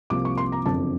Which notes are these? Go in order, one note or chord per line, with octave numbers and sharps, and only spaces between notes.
C2 C3 F3 A#3 D6
C#6
C6
A#5
F#1 F2 D3 A5